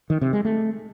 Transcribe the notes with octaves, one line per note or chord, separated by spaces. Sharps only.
D#3
C3
G#3
A3